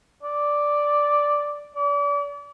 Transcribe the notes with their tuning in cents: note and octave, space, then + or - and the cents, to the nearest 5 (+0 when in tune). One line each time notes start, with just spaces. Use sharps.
D5 +0
D5 -40